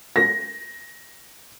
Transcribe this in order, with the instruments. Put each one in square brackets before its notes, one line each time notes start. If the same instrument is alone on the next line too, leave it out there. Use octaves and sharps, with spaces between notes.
[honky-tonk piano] A#6